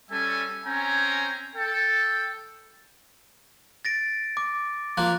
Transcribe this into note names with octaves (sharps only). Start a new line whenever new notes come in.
G3 C#4 A4 E5 G#5
C4 C#4 G5 G#5 A#5
A4 G5
A6 A#6 D7
D6
F3 A#3 F#6